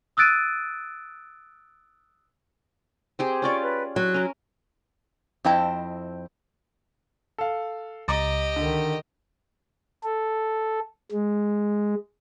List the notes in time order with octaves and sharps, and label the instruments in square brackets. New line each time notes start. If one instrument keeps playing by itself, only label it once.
[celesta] D#6 E6 F#6 A6 D7 D#7
[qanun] C4 G4 G#4
[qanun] C#4 F4 D5 [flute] C#6
[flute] B4
[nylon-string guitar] F#3 [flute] F#6
[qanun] C#4 A#4
[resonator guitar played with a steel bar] F2 C4 E4 D#5 G5 A5
[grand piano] A4 F5
[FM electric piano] C#2 [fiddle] G4 D#5 [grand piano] A#5 D6 A6
[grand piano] D3 [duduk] D#3
[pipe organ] A4
G#3